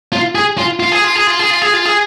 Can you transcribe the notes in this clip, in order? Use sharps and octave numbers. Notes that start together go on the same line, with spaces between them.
F4
G#4
F4
F4
G#4
F4
G#4
F4
G#4
F4
G#4
F4
G#4